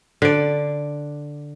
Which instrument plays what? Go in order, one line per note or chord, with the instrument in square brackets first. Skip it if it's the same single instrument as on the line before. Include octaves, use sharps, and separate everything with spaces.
[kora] D3 D5